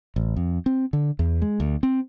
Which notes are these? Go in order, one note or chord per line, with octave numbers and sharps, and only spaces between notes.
A1
F2
C4
D3
E2
G#3
D2
C4